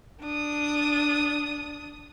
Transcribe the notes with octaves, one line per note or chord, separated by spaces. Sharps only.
D4 D#6